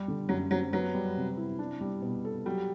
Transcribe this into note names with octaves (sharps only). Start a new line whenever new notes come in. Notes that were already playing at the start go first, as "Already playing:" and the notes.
Already playing: G3 G4
D3
F#2 F#3
F#3 C4
F#3 B3
G3
C3
E4
D4
G3
B2
A4
F#3 G3